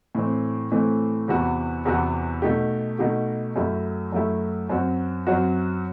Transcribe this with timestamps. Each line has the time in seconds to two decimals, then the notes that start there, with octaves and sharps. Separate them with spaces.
0.15 A2 E3 A3 C4
0.72 A2 E3 A3 C4
1.28 E2 C3 E3 B3 F#4
1.85 E2 C3 E3 B3 F#4
2.42 B2 A3 D#4 G4
2.99 B2 A3 D#4 G4
3.56 F#2 F#3 A3 E4 G4
4.12 F#2 F#3 A3 E4 G4
4.69 F#2 F#3 C4 F#4
5.27 F#2 F#3 C4 F#4